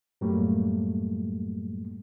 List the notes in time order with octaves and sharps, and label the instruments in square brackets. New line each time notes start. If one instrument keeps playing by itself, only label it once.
[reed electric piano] F#2 A2 F#3 G3 A3 A#3